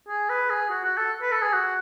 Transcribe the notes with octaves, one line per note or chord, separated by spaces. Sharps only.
G#4
B4
G#4
F#4
F#4
A4
B4
A4
G#4
F#4